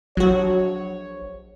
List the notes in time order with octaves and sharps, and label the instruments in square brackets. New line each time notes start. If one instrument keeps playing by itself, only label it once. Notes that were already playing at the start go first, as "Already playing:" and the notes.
[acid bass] A#1 [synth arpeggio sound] F#3 F#4 [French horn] C#5